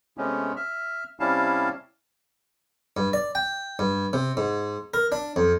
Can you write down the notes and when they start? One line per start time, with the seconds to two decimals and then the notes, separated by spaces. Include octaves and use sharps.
0.18 C3 G#3 A3 B3 C#4
0.56 E5 F6
1.20 C3 G3 C#4 E4 F5 A5
2.97 G2
3.13 D5
3.35 G5
3.79 G2
4.13 C3
4.37 G#2
4.94 A#4
5.12 D4
5.36 F2